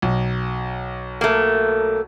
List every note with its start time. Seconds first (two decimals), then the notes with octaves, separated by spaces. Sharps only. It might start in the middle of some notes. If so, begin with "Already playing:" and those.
0.02 B1
1.21 A3 A#3